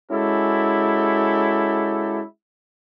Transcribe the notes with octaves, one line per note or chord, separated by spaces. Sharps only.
G#3 C#4 E4 F#4 G4 A4